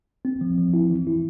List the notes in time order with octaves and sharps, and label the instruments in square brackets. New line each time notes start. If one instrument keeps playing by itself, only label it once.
[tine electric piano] C4
F3
F3
E4
E3
E4